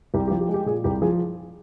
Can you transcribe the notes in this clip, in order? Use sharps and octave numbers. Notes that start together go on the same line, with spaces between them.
C2 G4
G4
F3
G4
G#3
G4
A#2 G#4
C2 G4
F3 G#4